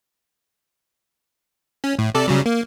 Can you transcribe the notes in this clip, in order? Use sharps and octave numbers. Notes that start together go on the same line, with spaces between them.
C#4
A2
C3 A4 D5
C#3 F#3 G3
A#3